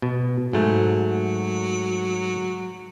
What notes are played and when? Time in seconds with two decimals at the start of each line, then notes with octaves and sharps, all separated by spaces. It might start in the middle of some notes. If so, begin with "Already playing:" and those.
0.02 B2
0.53 G#2 F#3 A3